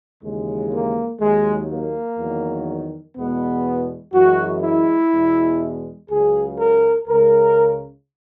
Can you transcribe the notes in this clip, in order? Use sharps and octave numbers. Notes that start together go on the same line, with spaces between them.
D#2 C#3 E3 G#3
A#3
D#2 D#3 F#3 G#3
A#3
E2 D#3 F#3
E2 B2 G#3 B3
F#2 E3 G#3 F#4
E4
E2 B2 G#3
C#2 C#3 F#3 G#4
A#4
C#2 C#3 G#3 A#4